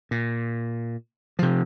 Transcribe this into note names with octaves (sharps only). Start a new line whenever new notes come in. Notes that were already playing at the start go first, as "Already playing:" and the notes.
A#2
C3 F3